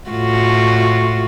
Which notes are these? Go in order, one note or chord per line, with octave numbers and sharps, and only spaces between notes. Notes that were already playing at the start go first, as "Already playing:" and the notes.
A2 F4 F#4